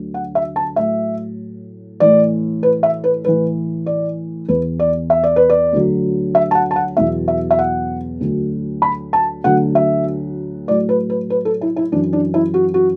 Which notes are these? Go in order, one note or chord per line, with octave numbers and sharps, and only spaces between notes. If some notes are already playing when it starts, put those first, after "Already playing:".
Already playing: D2 D3 F#3
F#5
E5
A5
A2 F#3 E5
A2 E3 D5
B4
E5
B4
A2 E3 B4
D5
E2 E3 B4
D5
E5
D5
B4
D5
D2 D3 F#3
E5
A5
F#5
A5
F#5
E2 B2 F#3 E5
E5
E5
F#5
D2 D3 F#3
B5
A5
D2 D3 F#3 F#5
E5
A2 F#3 D5
B4
B4
B4
A4
E4
E4
F#2 E3 D4
D4
E4
F#4
F#4